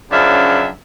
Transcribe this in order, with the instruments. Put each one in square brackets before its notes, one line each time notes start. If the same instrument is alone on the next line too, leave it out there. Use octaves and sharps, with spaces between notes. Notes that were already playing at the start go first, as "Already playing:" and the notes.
[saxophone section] F#2 C#3 F3 D4 E5 F5